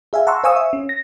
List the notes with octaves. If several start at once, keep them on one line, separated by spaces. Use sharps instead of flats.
G#4 E5 F5 G#5
F#5 A5 A#5 C6 C#6 E6
C5 F5 G#5 C#6 D#6 E6
E5
C#4
A#6